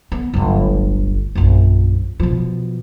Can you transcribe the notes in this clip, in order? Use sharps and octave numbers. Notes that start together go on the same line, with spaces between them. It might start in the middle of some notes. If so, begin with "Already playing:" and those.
B3
D1 G1
A#1 F#2
B2 F3